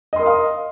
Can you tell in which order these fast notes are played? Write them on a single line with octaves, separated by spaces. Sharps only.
D#5 C6 A#4 D#6 F5